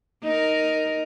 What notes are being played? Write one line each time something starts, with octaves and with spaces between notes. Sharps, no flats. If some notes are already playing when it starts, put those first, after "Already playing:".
D#4 A#4